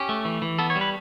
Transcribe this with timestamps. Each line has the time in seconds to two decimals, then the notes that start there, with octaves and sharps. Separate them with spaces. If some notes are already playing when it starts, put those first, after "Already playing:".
Already playing: C#4 G4
0.09 A3
0.25 E3
0.42 E3
0.59 B3 A4
0.70 C#5
0.76 G3
0.81 B4